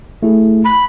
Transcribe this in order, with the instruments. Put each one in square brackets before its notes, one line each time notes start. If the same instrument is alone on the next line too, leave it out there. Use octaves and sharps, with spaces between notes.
[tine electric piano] A3 E4 G#4
[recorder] B5